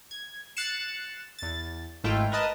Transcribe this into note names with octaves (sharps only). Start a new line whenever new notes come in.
G#6
F#6 A6 C7 C#7 E7
E2 A6
G#1 G#2 A3 E4 F4 G5
A#4 B4 D#5 A5